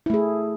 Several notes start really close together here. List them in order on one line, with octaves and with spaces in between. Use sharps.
E4 A3 G#4